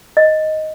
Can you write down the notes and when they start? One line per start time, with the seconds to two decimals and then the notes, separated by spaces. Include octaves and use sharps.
0.17 D#5